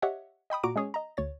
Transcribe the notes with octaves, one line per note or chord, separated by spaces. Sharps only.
G4 C#5 D#5 E5 F#5
D#5 G5 B5 D#6
A#2 F#4 A#5 D6 D7
G#3 C#4 G#4 C#5
D#5 A#5
D2 C#5 A6